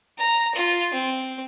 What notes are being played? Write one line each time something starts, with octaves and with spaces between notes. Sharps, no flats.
A#5
F4
C4